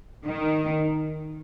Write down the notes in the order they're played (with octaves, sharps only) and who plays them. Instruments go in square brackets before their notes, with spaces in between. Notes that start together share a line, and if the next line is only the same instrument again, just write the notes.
[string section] D#3